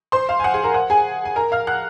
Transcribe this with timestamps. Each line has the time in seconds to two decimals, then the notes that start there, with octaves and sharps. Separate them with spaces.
0.12 C5 C6
0.29 F5
0.40 G#5
0.44 F#5
0.54 G#4 G#5
0.64 A#4 A#5
0.74 F#5
0.90 G#4 G#5
1.25 G#5
1.36 A#4 A#5
1.52 F5 F6
1.67 F#5 F#6